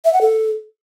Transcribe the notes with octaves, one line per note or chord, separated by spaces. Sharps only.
E5
F#5
A4